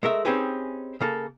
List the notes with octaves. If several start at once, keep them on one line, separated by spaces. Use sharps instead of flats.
G#3 A3 A#4 E5
C4 C#4 D#4 G4 G#4 B4
C#3 A#3 A4